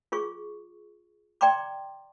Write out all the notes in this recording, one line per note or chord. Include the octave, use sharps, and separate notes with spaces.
F4 G#4 C#6
D5 G5 A#5 C6 D6